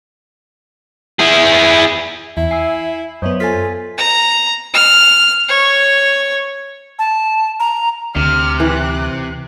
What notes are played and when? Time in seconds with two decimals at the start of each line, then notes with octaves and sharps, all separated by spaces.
1.20 E4 G#4
2.37 E2 E4 E5
2.51 G#5 E6 C7
3.22 F#2 B3 C5 C#5 D#5 E5
3.40 F4 A4 G#5 A6 B6
3.98 A#5
4.74 F6
5.49 C#5
6.99 A5
7.60 A#5
8.16 D2 C3 F6
8.60 E3 F#6